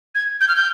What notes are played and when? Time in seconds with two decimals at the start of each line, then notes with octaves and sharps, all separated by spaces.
0.15 G#6
0.41 G6
0.48 F6
0.56 G6